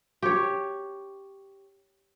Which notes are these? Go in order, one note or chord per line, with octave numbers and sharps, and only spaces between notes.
G4 C#5